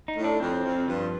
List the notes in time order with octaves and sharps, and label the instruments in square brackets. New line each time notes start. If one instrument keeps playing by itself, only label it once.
[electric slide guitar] D#4
[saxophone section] A2
[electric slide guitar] D4
[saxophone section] F2 [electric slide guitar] C4
[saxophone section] F2
[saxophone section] G2 [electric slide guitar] F3